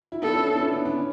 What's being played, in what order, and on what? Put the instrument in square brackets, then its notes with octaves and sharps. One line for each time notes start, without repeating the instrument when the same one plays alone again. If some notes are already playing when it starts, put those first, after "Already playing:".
[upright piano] E4
[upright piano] B3 D4 [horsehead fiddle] A4
[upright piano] C#4 E4
B3 D4
C#4 E4
B3 D4
B3 D4
C#4